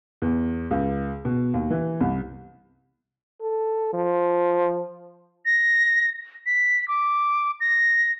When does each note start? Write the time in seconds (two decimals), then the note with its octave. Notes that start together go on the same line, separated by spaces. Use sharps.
0.22 E2
0.71 C#2
1.25 B2
1.54 D#2
1.71 E3
2.01 C2
3.41 A4
3.94 F3
5.46 A#6
6.46 B6
6.88 D6
7.60 A#6